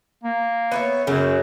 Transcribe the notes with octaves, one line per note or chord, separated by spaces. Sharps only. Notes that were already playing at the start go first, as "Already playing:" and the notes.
A#3
B3 C#5 E5
F#2 C#3 F#3